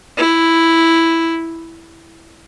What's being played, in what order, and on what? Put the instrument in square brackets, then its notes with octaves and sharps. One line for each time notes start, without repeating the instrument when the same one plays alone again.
[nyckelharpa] E4